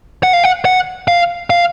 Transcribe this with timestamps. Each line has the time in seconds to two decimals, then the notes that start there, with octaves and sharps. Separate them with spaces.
0.23 F#5
0.33 F5
0.44 F#5
0.65 F#5
1.08 F5
1.50 F5